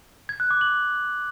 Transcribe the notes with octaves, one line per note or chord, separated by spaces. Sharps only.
G#6
F#6
D6
F#7